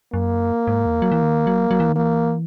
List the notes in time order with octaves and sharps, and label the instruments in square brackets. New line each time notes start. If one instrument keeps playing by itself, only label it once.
[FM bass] F#2 [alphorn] A#3
[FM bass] G#2
E2
F#3
E3
D#3
F#3
F#3
E3
D#3
[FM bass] E3 [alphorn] A#3